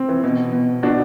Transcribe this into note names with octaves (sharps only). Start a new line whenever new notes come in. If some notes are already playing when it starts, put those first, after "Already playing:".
Already playing: C4
E3
B2
B2
B2 D4 F#4